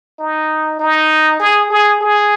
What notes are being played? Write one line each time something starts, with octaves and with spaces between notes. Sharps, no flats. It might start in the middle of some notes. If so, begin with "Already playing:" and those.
D#4
D#4
G#4
G#4
G#4